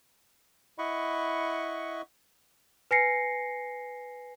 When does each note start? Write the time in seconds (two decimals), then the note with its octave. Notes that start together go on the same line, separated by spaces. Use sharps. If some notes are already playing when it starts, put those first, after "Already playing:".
0.78 E4 D#5 F#5 B5 C#6
2.91 B4 G#5 A#6 C7 C#7